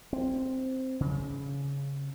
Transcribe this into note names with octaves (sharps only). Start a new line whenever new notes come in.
C4
C#3